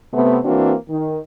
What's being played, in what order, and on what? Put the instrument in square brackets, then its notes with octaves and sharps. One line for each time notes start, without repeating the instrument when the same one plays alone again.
[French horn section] C3 A3 B3
E3 A#3 C4 D4 F#4
D#3